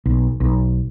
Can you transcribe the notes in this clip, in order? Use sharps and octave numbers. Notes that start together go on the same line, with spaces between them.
B1
B1